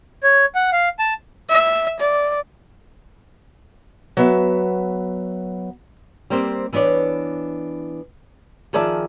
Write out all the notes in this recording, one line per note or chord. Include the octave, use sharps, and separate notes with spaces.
C#5
F#5
F5
A5
E5
D5
F#3 B3 E5
G3 A#3 C4 G4 C5
E3 B3 D4 C#5 D5
D#3 F3 G#4 D5 E5 A5